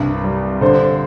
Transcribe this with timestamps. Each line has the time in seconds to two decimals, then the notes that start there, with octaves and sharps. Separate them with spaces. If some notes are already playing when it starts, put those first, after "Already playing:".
Already playing: C2 G2
0.24 G3
0.61 D3 C5